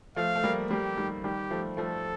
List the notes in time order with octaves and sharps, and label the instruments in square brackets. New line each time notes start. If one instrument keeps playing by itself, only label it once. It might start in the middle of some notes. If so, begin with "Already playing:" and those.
[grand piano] F3 A3 [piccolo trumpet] F5
[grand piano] A3
G3 A#3
[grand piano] G3 A#3 [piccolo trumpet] G4
[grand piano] D#3 G3
[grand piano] D#3 G3 [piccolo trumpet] G4
[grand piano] F3 A3
[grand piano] F3 A3 [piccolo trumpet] A4